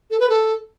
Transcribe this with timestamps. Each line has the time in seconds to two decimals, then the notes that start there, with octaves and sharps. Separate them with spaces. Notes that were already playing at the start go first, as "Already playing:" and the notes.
0.11 A4
0.20 B4
0.29 A4